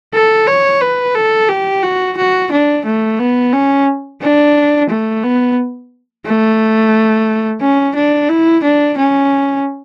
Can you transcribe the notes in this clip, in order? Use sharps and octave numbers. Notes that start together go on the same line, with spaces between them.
A4
C#5
B4
A4
G4
F#4
F#4
D4
A3
B3
C#4
D4
A3
B3
A3
C#4
D4
E4
D4
C#4